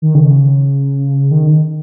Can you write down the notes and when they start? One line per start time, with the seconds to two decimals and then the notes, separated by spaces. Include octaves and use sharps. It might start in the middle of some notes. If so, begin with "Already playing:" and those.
0.02 D#3
0.15 C#3
1.31 D#3